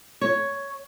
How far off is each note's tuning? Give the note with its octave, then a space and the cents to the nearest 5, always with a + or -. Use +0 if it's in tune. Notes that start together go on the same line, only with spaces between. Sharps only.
C#5 +5